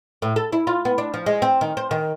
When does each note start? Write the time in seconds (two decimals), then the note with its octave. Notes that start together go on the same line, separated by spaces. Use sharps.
0.22 A2
0.36 A4
0.53 E4
0.67 F4
0.85 B3
0.98 D4
1.14 F3
1.26 G#3
1.42 C4
1.61 D#3
1.77 C5
1.91 D#3